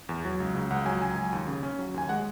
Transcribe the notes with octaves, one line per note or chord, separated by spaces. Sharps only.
E2
F#3
C#2
C#3
C#2 F#5
F#3 G#5
C#2 G#5
F#3
D#2
C#3
C#4
F#3
D#2 G#5
G#3 F#5